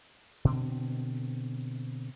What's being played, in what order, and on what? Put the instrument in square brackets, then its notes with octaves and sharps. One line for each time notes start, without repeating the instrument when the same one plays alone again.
[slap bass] B2 D3 C4